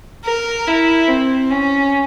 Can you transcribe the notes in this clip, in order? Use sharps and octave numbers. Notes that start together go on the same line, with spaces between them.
A#4
E4
C4
C#4